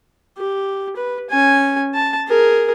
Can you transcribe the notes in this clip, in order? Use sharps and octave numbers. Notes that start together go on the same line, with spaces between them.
G4
B4
C#4 G#5
A5
G#4 A#4